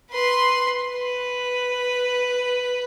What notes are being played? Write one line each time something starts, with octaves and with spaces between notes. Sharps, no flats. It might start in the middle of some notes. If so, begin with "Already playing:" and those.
B4 C6
B4